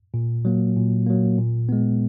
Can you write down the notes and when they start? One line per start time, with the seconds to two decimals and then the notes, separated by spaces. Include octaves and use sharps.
0.14 A#2
0.45 F#3 A#3
0.76 A#2
1.07 F#3 A#3
1.38 A#2
1.69 G#3 B3